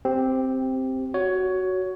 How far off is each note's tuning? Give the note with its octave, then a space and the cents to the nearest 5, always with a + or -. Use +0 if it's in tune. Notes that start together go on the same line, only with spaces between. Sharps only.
C4 +0 G4 +0
F#4 +5 C#5 +15